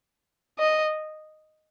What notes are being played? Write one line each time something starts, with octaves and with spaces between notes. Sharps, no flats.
D#5